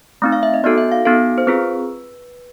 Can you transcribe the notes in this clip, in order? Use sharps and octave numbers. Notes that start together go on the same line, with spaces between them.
A3 C4 D#4
F5
E5
D#5
B3 D#4 F#4 A4 D5
E5
F5
B3 D#4 F#4 A4 F5
C5
C4 F4 G#4 B4